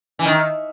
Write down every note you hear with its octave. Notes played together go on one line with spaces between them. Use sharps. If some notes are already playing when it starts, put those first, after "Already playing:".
E3
D#3